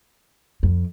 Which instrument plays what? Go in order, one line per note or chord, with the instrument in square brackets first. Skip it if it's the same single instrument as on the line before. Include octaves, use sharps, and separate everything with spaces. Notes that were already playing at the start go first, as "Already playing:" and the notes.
[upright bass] F2